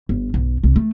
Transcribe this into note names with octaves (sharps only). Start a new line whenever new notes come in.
G1
B1
C2
A3